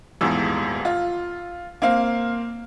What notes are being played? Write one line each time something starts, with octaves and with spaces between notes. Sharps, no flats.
D#1 E2 G#2 E6
F4
A#3 C4 F5